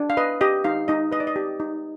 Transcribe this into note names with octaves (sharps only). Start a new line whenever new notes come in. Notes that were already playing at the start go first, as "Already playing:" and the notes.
Already playing: D4
F5
B4 D#5
G4 D#5
D#4 F5
D#4 D#5
B4 D#5
D5
D#5
G4
D#4